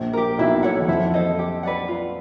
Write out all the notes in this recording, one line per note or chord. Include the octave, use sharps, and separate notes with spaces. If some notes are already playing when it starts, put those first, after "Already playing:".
Already playing: A#1 A#2
G4 A#4
B1 B2 E4
A4 C#5 F#5
E3
F2 F3 E4
A4 C5 D#5
G4
B4 D5 F#5
F4